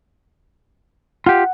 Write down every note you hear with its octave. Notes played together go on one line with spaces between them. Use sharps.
F4 G4 F#5